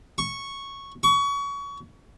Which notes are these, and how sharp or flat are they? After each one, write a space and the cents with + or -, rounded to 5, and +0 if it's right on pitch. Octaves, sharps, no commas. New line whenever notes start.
C#6 -5
C#6 +25